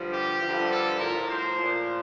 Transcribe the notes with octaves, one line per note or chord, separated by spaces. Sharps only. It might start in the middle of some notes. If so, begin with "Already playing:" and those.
Already playing: G2 D3 F3
G4
G2 D3 F3
A4
A2 F3 A#4
C5
A#2 F3